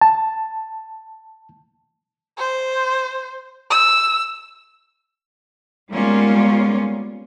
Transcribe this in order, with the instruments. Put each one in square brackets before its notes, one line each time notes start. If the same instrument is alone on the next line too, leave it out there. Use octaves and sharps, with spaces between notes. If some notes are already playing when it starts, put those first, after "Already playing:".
[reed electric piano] A5
[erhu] C5
E6
[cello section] G3 G#3 A#3 B3 C#4 F4